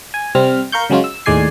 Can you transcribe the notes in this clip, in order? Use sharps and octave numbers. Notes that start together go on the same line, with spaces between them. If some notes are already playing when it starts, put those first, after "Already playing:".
G#5
C3 G3 C4 F6
A#4 F5 C#6 G6
C#3 F#3 G#3 C#4 F4
E6
D#2 A2 G#3 D5 G#5 C7